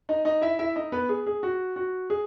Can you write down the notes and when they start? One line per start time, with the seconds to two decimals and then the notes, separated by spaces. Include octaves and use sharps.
0.09 D#4 D#5
0.25 D#4 D#5
0.42 E4 E5
0.59 E4 E5
0.76 D#4 D#5
0.92 B3 B4
1.09 G#4
1.27 G#4
1.43 F#4
1.76 F#4
2.10 G#4